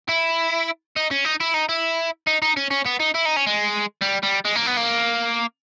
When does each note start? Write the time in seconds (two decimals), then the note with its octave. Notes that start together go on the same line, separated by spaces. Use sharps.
0.09 E4
0.96 D#4
1.11 C#4
1.25 D#4
1.40 E4
1.54 D#4
1.69 E4
2.27 D#4
2.42 D#4
2.57 C#4
2.71 C#4
2.86 B3
3.00 D#4
3.14 E4
3.25 D#4
3.36 C#4
3.47 G#3
4.02 G3
4.23 G3
4.45 G#3
4.56 A#3
4.67 B3
4.77 A#3